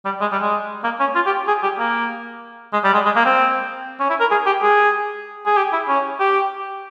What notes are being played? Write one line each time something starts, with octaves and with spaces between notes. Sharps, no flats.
G3
G#3
G3
G#3
A#3
C#4
F4
G4
G#4
G4
A#3
G#3
G3
G#3
G#3
A#3
C4
C#4
E4
A#4
G#4
G4
G#4
G#4
G4
E4
C#4
G4